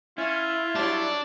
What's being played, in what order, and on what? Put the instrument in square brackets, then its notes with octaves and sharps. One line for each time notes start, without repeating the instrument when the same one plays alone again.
[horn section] C#4 [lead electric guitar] E4 [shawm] F4
[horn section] F#3 G3 [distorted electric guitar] D4